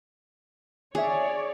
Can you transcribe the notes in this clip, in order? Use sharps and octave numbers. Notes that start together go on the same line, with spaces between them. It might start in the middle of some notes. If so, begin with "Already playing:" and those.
D4 G#4 C#5 D5 E5